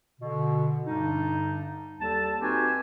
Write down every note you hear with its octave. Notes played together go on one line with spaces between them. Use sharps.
B2 D3
G2 D3 G3 D4 D#4
D#2 G3 A4 A5
C4 D#4 F#4 G4 B4 G#5